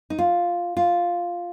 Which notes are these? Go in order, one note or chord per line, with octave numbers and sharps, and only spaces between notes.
D#4
F4
F4